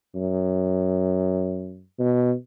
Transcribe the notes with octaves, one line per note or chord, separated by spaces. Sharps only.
F#2
B2